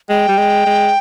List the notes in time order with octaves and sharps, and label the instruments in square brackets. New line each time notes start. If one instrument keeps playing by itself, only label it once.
[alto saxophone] G#3 [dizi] G5
[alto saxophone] G3
G#3
G#3